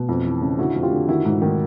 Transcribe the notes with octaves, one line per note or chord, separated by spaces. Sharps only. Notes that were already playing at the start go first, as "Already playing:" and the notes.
Already playing: B2
F2
E3
C#3
D3 E4 F#4
F2 F#4
F4 G4
D3
D#3 E4 F#4
G#2
D#3